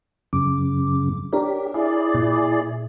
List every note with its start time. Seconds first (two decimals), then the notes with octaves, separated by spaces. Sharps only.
0.33 F#2 C#3 D6
1.33 D4 G4 A#4 C#5
1.74 E4 G#4 D5
2.14 A#2